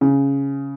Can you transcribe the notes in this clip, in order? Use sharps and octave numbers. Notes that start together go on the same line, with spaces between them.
C#3